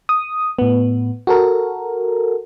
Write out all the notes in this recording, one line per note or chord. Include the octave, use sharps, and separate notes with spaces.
D#6
A2 B3
F#4 A4 A#4